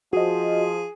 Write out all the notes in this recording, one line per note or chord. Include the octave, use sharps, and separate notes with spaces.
F3 F#4 G#4 D#5